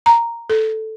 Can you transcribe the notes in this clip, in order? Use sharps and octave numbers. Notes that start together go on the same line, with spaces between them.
A#5
A4